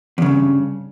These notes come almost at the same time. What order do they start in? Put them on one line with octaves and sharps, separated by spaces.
E2 C#3 G2